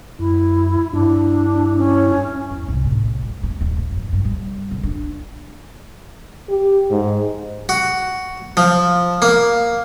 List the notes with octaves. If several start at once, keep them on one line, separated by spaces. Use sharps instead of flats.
F#2 E4
G2 D4 E4
C#4
E2
C2
A2
G#3
B3
D1
G#1
F2
G2
G3
D3
D4
G4
G#2
F#4
F3
A#3